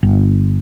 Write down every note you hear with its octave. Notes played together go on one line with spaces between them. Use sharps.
G1